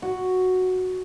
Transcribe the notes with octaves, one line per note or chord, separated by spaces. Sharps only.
F#4